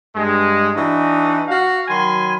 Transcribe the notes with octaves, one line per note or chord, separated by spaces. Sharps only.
G2 G#3
E3 D4 D#4 F#4 D#5
F#4 F5
D#3 F#3 G#5 B5 C6